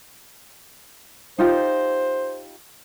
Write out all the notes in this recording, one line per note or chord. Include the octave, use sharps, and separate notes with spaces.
D#4 F4 G4 C5